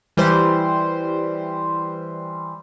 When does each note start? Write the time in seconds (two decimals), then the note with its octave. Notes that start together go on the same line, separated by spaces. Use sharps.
0.17 E3 G3 C5